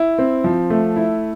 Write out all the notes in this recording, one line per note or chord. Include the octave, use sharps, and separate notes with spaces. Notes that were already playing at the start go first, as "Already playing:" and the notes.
Already playing: E4
C4
F3
A3
E4